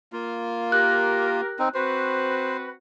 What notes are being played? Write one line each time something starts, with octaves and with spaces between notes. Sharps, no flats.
A#3 F4
G4 A#4 F#6
C4 D#4
C4 F#4 B4 C5